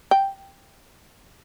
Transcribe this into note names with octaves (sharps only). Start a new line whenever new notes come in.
G5